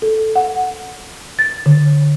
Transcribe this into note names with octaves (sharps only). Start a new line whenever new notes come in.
A4
F#5
A6
D3